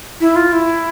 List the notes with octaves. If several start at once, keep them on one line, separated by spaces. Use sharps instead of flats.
E4
F4
E4